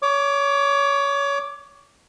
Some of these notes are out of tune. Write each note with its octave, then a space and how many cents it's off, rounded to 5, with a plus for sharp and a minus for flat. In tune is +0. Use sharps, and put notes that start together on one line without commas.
C#5 +20 D6 +0